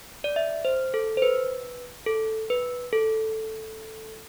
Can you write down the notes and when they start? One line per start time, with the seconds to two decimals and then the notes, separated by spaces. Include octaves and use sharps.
0.24 D5
0.36 E5
0.65 C5
0.94 A4
1.17 C5
1.22 B4
2.06 A4
2.50 B4
2.93 A4